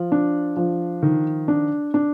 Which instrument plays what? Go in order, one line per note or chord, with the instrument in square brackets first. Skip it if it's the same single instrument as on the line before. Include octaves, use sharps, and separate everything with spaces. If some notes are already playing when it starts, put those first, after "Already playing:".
Already playing: [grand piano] F3
D4
F3
D#3
D4
D4